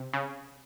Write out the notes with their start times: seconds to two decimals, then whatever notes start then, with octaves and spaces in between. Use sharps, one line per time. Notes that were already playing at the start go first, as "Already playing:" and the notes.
Already playing: C3
0.13 C#3